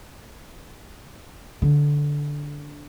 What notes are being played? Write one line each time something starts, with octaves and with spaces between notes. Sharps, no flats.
D3